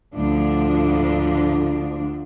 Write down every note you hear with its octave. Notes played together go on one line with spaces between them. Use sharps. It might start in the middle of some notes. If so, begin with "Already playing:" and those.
D2 A2 D3 F3 D4